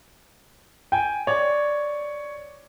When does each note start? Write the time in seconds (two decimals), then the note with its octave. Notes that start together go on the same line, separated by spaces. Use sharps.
0.92 G5 G#5
1.27 C#5 D5